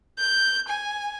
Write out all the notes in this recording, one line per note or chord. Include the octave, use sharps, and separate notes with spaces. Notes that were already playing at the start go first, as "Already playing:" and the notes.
G6
G#5